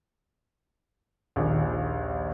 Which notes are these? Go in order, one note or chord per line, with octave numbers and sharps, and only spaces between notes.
A#1 D#2